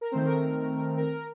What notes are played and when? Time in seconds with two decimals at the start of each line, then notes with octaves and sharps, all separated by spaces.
0.01 A#4
0.12 D#3 A3 C4 C5
0.26 A#4
0.97 A#4